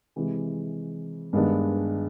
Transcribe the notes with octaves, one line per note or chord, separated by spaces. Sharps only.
C3 E3 G#3
G2 D#3 G#3 B3 D4